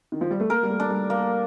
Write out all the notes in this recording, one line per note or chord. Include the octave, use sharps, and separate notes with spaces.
D#3
F3
G3
A3
A#3 A#4
G3
A3
D4
G3
A#3